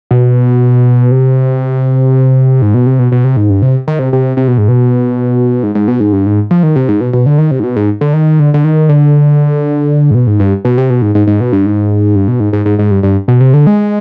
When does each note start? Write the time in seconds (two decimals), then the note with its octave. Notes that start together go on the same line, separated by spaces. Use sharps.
0.11 B2
1.11 C3
2.62 G#2
2.74 B2
2.86 C3
2.99 B2
3.12 B2
3.24 C3
3.37 G#2
3.50 G2
3.62 C3
3.88 D#3
3.99 C3
4.13 C3
4.37 C3
4.48 B2
4.58 G#2
4.68 B2
5.63 G#2
5.75 G#2
5.88 B2
6.00 G#2
6.13 G2
6.26 G#2
6.51 F3
6.63 D#3
6.76 C3
6.88 G#2
7.01 B2
7.13 B2
7.26 D3
7.38 D#3
7.51 C3
7.60 G#2
7.64 B2
7.76 G#2
8.01 D3
8.13 D#3
8.39 D3
8.54 D3
8.64 D#3
8.89 D3
10.11 G#2
10.15 B2
10.27 G#2
10.40 G2
10.65 B2
10.78 C3
10.90 B2
11.02 G#2
11.15 G#2
11.27 G#2
11.40 B2
11.53 G2
11.66 G#2
12.15 G2
12.28 B2
12.40 G#2
12.53 G#2
12.66 G#2
12.79 G#2
12.91 G2
13.03 G2
13.28 B2
13.41 C3
13.53 D3
13.67 G#3